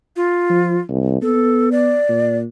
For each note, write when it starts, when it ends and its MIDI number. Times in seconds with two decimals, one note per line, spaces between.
0.16 0.81 65
0.50 0.79 53
0.89 1.21 36
1.22 1.97 59
1.22 1.69 69
1.72 2.37 74
2.09 2.45 46